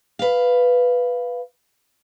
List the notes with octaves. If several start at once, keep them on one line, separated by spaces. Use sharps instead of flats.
B4 F5